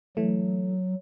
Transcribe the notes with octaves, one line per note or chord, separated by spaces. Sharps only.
E3 F#3 A3